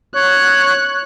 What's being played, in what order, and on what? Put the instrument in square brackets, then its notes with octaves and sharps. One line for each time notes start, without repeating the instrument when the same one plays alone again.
[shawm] C#5 [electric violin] F#6